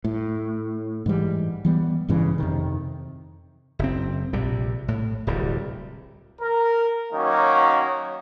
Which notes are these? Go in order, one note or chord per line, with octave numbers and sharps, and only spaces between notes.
A2
G#2 E3 G3
E3 G3 B3
A1 G2 C#3 E3
F2 C3 D#3
F#1 C4
A#1 C3 G3
A2
D1 C2 G3
A#4
D#3 F#3 A#3 C#4